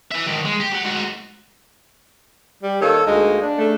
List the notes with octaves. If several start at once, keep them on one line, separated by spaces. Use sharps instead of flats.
E3 E5
G#2 D#3
G#3
G4
F#3 F#5
G#2 F#4
G3
D#3 A#3 A4 C#5
D2 G#3 A#3 D#4
D4
C#3 A3